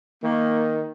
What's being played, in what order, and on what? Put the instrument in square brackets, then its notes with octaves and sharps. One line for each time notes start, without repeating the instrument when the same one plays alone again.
[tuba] D#3 [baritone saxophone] A#3